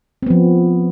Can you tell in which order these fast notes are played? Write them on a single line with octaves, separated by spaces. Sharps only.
C4 B3 F3